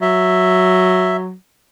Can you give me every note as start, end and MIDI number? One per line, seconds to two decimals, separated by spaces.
0.02 1.33 54
0.02 1.17 76